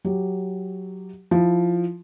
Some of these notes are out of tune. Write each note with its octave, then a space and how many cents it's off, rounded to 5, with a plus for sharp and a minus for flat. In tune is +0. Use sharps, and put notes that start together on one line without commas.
F#3 +0 G4 +0
F3 +0 E4 +0